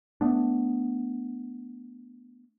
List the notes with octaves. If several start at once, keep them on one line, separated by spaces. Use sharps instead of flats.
A3 B3 D4